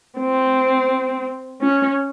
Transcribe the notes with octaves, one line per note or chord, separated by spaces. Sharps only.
C4
C#4